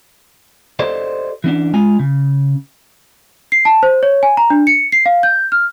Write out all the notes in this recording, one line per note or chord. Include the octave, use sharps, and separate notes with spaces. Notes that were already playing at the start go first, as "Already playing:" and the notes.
G4 A4 C5 D5 D#5
E3 C#4 D4
G#3 F4 G#5
C#3
C7
A5
C5
C#5
G#5
A#5
D4
C#7
C7
F5
G6
F6